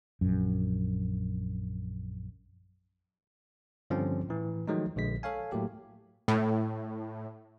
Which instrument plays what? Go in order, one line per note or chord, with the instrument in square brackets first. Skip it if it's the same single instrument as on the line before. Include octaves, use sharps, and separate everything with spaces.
[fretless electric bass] A#1 F#2
[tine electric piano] G2 D3 F3 G3 C4 C#4
A2 E3
D#3 F3 F#3 G#3 A3 D#4
A#1 D3 G#3 B6
A4 C#5 F5 G#5
A2 F#3 A3 A#3 G4
[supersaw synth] A2